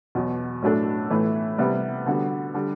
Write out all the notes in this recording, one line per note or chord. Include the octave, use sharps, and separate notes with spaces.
E2 B2 F#3
A2 F#3 A3 D4 A4
A2 E3 A3 E4
C3 G3 B3 E4
D3 G3 B3 F#4
D3 G3